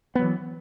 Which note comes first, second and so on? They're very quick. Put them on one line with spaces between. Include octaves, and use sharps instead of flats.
B3 F#3 E3